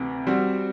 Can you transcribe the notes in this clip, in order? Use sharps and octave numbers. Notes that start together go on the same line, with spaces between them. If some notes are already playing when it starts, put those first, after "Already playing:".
Already playing: D2 C3 E3
G3 C4 F#4